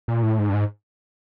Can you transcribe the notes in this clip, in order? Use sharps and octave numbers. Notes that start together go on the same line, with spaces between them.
A#2
A2
G#2
G2
G#2